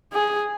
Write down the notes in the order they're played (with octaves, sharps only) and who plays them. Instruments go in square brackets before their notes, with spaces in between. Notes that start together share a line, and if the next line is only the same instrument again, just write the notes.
[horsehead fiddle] G#4